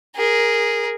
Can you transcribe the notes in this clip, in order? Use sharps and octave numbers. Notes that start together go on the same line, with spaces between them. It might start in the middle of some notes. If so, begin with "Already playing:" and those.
G#4 A#4